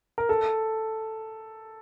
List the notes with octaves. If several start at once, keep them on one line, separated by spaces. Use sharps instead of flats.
A#4
A4